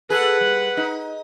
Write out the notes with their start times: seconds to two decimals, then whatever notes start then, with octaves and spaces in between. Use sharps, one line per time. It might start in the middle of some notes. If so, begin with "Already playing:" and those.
0.10 G#4 A4 B4 F#5
0.41 G3
0.77 D#4